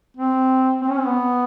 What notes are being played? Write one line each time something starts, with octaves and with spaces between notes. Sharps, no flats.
C4
C4
C#4
C4
B3